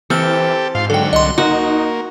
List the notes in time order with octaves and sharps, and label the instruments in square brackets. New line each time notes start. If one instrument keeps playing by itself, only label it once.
[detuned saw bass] E3 [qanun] C4 [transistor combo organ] G4 A4 [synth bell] F6 C#7
[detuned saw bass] G#2 [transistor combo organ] F4 F5 C6
[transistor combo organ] D3 F#3 [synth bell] A4 G5
[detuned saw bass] C2 [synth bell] D#5 C6
[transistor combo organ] A#3 [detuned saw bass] D#4 [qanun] F#4